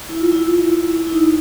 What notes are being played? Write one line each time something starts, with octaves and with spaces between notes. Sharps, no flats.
E4
F4
E4
F4
E4
E4
D#4